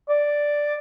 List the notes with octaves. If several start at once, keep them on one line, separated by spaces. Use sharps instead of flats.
D5